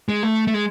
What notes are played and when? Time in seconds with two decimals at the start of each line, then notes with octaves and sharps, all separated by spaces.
0.09 G#3
0.23 A3
0.47 A3
0.54 G#3